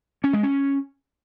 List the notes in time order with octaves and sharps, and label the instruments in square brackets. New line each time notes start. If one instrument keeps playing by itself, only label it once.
[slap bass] C#4
G#3
C#4